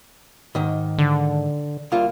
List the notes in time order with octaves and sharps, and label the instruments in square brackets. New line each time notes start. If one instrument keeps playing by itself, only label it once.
[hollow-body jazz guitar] G#2 D#3
[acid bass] D3
[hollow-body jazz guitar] C2 A#3 F4